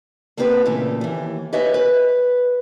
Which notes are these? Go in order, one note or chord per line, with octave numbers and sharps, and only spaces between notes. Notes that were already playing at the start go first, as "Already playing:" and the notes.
A#3 C4 D4 G4 B4
A#2 C#3 E3 A3
D#2 E3
G4 B4 C#5 D#5 E5 G#5
B4